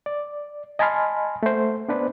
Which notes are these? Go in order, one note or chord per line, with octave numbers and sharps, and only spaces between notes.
D5
D#5 G#5 A5 B5 C6 F6
A3 C5
B3 D4 B4 C5 D5